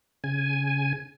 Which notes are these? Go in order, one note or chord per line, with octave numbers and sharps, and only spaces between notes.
C#3 G#5